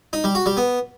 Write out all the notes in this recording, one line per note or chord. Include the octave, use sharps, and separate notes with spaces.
D#4
G3
F#4
G3
B3